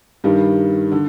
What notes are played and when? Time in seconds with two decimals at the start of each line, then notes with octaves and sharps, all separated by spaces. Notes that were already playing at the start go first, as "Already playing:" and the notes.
0.24 G2 D#3 G3
0.92 D3